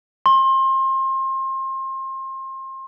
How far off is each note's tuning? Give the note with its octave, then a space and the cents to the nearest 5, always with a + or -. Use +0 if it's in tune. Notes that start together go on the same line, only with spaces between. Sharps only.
C6 +30